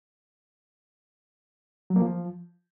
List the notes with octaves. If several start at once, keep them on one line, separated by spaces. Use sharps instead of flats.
F#3
A#3
F3